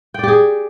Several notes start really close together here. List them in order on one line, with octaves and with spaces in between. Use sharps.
G5 D5 G4 G#4